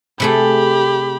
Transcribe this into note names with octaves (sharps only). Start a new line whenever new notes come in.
C3 A3 G4 G#4 B5